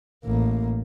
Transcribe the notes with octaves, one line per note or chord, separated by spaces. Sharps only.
A1 A#3